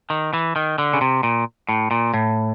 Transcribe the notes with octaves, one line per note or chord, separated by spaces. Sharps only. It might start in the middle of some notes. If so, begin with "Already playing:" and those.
D#3
E3
D#3
D3
C#3
C3
A#2
A2
A#2
A2